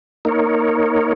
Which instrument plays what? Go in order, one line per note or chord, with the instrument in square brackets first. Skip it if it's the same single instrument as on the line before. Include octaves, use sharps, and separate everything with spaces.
[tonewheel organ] A#3 D#4 A#4 C#5